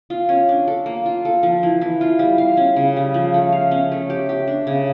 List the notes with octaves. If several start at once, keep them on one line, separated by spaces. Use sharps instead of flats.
F4
C#4
D4
A4
A#3
F4
A4
F3
E3
E3
F4
G3
F5
C#4
C#3
G3
F3
A3
F5
C#4
A3
G4
G4
D4
C#3